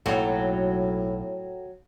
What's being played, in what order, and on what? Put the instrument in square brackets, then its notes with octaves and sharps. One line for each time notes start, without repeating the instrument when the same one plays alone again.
[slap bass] B1 A#3 [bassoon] A2 [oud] F#3 [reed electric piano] A4 C#5 G5